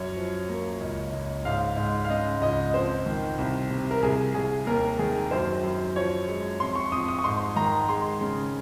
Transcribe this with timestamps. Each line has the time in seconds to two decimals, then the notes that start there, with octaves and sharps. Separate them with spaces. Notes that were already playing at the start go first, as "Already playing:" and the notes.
Already playing: F#2 C#5
0.16 F3
0.49 A#3
0.81 C#2
1.13 C#2
1.45 G#2 F5
1.77 G#2
2.04 F5
2.09 C#3 D#5
2.41 C#2 D#5
2.74 F2 C5
3.06 D#3
3.38 C2
3.70 C3
3.91 A#4
4.02 C2 G#4
4.34 C2 G#4
4.67 D#2 A#4
4.99 D#3 G#4
5.31 F#2 C5
5.63 F#2
5.96 F3 C#5
6.28 G#3
6.60 F2 C6
6.76 C#6
6.92 F2 D#6
7.08 D#6
7.19 C#6
7.24 G#2 C6
7.56 D#3 A#5
7.89 G#3 C6
8.21 C#3